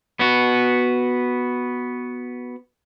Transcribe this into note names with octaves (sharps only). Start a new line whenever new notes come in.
B3 F#4